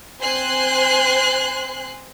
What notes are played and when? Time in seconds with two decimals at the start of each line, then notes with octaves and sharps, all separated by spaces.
0.21 C4 C5 G#5 C6 F#6 C7